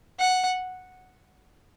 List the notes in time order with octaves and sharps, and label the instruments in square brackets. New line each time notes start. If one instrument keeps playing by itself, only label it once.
[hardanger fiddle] F#5